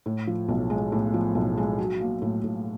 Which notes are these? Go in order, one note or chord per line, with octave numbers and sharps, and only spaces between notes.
A2
F3
B1
G#3
A2
F3
B1
G#3
F#3
A#3
A2
A2